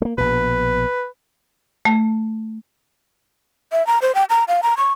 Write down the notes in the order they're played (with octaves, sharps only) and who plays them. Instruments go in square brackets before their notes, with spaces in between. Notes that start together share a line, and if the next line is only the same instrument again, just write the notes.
[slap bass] A3 A#3
[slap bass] A#1 B2 [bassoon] B4
[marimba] A3
[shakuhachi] E5
A#5
C5
G5
A#5
F5
A#5
C#6